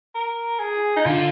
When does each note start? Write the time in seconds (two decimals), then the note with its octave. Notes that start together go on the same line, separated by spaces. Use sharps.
0.15 A#4
0.60 G#4
0.97 D#4
1.05 D3 F4